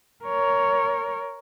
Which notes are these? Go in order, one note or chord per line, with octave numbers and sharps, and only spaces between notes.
A#4 C#5